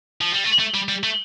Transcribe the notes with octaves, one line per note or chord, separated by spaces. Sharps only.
F3
G3
A3
A3
G3
G3
A3